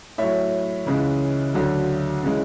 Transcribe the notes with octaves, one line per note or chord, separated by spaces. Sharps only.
A2 F#3 C#5 E5
C#2 C#3 E3 G#3
D2 D3 F#3
C#3 E3 G#3